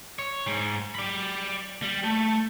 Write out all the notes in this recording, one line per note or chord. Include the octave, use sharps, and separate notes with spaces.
C#5
G#2
D5 B5
G3
A3